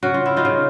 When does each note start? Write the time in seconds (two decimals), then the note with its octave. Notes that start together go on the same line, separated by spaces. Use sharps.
0.03 C#3 F#4
0.14 F4
0.26 E4
0.36 D#4 F4
0.45 C#3